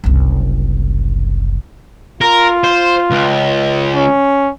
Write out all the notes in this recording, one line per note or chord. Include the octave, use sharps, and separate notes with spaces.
F#1 C2
F4 A#4
C5
C#2
C#4